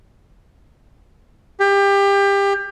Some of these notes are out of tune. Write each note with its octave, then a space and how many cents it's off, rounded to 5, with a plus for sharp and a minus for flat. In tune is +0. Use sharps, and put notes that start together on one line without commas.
G4 +25